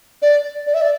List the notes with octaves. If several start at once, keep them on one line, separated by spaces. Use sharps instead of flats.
D5
D5
E5
D5